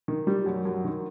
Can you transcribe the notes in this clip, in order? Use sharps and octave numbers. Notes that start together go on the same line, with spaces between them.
D#3
G3
F#2
F#2
D#3